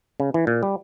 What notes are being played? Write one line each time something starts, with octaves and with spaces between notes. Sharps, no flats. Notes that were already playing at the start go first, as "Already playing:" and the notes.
C#3
E3
A#2
G3